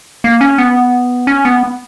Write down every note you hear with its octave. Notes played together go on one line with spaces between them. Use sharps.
A#3
C#4
B3
C#4
B3